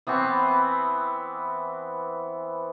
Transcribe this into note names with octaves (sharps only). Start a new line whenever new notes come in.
E3 B3 C4 C#6